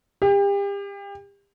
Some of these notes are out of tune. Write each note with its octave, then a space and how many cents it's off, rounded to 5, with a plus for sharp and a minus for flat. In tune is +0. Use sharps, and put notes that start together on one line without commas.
G4 +35